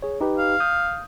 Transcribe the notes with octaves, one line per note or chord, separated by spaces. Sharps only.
G#4 C#5
D#4 G4 B4
F5
D#6 G6